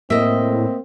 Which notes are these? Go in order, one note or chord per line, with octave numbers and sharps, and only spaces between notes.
A2 A#3 C4 D#5 E5